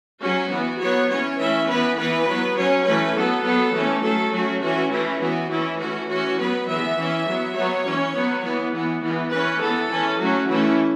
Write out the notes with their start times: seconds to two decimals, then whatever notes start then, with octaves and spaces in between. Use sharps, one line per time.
0.21 F#3 C#4 F#4
0.50 E3 B3
0.79 F#3 B3 C#5
1.09 E3 C#4 C#5
1.38 E3 A3 C#4 E5
1.67 E3 B3 B4
1.97 E3 B3 B4
2.27 F#3 B3
2.56 F#3 C#4 C#5
2.85 E3 A3 C#4 B4
3.15 F#3 B3 A4
3.44 F#3 B3
3.73 E3 A3 C#4
4.03 F#3 A3 C#4 A4
4.32 F#3 A3 C#4 F#4
4.61 E3 C#4 F#4
4.91 E3 A3 C#4 E4
5.20 E3 B3 F#4
5.49 E3 C#4 E4
5.78 E3 A3 C#4 F#4
6.09 E3 C#4 F#4
6.38 F#3 B3 B4
6.67 E3 B3 E5
6.96 E3 C#4
7.26 F#3 B3
7.55 F#3 B3 C#5
7.85 E3 C#4
8.14 F#3 B3
8.44 E3 B3
8.73 E3 B3
9.02 E3 B3
9.31 E3 C#4 B4
9.61 E3 B3 A4
9.90 E3 C#4
10.19 F#3 A3 C#4 F#4
10.49 E3 A3 C#4 E4